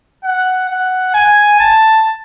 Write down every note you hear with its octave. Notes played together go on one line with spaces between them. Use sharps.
F#5
F#5
G#5
A5